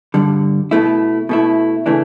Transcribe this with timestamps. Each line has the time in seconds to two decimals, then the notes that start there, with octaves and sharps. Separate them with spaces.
0.14 G2 D3 G3
0.71 B2 A3 E4
1.29 B2 A3 E4
1.86 C#3 E3 A3 D4